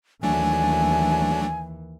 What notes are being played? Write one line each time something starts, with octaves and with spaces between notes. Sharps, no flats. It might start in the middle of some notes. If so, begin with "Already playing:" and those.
D#2 E3 F#3 A3 D4 G#5